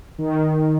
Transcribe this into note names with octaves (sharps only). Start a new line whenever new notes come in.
D#3